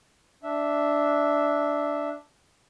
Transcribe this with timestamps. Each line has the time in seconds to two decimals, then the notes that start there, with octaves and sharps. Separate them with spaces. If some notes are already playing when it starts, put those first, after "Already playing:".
0.43 D4 E5